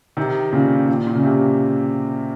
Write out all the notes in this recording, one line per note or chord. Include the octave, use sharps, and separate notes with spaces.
C3 D#3
A#2 C#3
A#2
A#2
C#3
C3